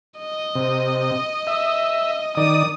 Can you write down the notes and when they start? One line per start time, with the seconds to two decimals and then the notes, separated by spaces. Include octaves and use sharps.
0.19 D#5
0.55 C3
1.47 E5
2.37 D#3 D5 D#6